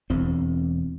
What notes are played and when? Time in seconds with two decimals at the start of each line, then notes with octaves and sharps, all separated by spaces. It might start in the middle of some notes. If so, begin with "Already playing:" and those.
0.10 E1 E2 C4